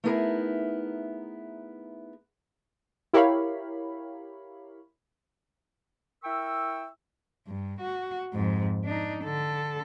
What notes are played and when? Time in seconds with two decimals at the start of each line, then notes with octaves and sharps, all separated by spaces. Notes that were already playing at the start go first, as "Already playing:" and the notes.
0.04 A3 B3 D#4 E4 G#4 A#4
3.13 E4 G4 A#4 C#5 F5 B5
6.24 E4 A#4 G5 C#6 E6
7.47 G2
7.81 F#4
8.33 F2 G#2
8.84 D4 D#4
9.24 D3 A4